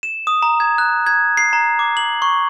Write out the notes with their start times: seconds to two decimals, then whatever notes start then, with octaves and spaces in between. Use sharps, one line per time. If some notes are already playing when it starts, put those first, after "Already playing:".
0.03 E7
0.27 D#6
0.42 A#5
0.60 G#6
0.78 F#6
1.07 G#6
1.37 C7
1.53 A#5
1.79 D6
1.97 F#7
2.22 C#6